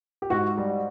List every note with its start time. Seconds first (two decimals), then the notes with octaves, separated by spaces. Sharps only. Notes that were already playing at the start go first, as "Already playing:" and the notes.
0.22 G4
0.30 G#2 F#4
0.58 G3